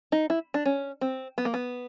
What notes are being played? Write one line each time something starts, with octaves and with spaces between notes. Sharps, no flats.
D#4
E4
D4
C#4
C4
B3
A#3
B3